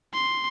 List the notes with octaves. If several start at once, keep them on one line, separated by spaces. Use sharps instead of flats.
C6